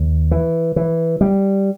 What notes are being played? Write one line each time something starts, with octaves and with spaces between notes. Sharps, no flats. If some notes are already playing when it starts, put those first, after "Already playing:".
Already playing: D#2
E3
E3
G3